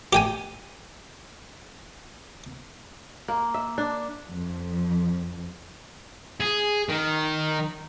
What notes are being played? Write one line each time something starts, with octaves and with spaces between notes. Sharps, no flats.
G4 G5 G#5
A#3
E5
D4
F2
G#4
D#3